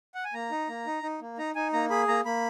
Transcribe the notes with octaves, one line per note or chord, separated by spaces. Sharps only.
F#5
G#5
A#3 A#5
D#4
A#3
D#4
D#4
A#3
D#4 A#5
D#4 G#5
A#3 A#5
G#4 B5
A#3 A#5
A#3 B5